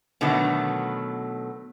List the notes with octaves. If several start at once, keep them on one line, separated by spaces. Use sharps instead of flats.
B2 D3 D#3 F#3 A3 B3